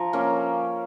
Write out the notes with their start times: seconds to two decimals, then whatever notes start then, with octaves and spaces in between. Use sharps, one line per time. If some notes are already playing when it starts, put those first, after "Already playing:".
Already playing: F3 A#5
0.13 A#3 C#4